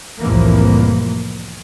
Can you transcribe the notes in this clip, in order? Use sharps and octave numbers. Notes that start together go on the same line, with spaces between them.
C2 F2 A2 E3 F3 A#3